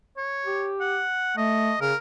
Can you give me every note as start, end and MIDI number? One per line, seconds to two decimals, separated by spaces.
0.17 0.71 73
0.46 1.02 67
0.80 1.33 78
1.37 1.72 57
1.37 1.80 75
1.81 1.92 49
1.81 1.96 70